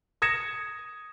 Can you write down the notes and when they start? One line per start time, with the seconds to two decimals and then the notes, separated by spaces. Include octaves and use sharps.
0.22 D#6 G#6 A#6 C#7 E7